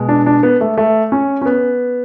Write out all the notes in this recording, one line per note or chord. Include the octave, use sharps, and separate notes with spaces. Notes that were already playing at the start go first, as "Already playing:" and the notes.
Already playing: B2 G#3
D4
D4
B3
A3
A3
C#4
C#4
B3